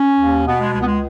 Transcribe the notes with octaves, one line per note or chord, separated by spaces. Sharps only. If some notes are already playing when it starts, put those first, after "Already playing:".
Already playing: C#4
D#2
B2 B3
G#3
C#2 G#3
B3
G#3